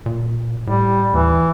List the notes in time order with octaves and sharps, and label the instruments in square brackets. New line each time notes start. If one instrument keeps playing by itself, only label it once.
[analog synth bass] A#2
[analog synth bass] A2 [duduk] G3
[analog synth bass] D#2 [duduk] E3